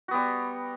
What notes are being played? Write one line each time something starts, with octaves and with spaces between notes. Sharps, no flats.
G3 B3 F#4